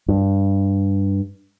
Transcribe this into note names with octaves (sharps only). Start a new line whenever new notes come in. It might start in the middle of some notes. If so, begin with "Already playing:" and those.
G2